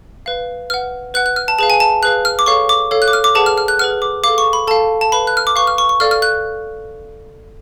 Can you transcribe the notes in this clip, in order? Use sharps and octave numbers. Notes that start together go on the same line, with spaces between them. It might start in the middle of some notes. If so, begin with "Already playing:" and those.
B4 F5
B4 F#5 F6
B4 F#5 F#6
F#6
F6
A5
G#4 B4 F5 A5
G#5
A5
G#4 B4 F5 F#6
F6
D6
A4 C#5 F5 C#6
D6
A4 C#5 F5
F#6
D6
F6
D6
G#4 B4 F#5 A5
F6
F6
F#6
G#4 B4 F#5 F6
D6
A4 F5 D6
C#6
B5
A4 F5 A5
A5
B4 F5 B5
F#6
F6
D6
B4 F5 C#6
F6
C#6
C#6
A4 D5 F5 F6
F6
F#6